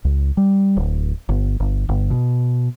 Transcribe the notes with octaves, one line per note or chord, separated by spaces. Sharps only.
C#2
G3
D1
G1
G1
G1
B2